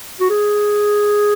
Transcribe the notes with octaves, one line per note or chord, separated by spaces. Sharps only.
F#4
G#4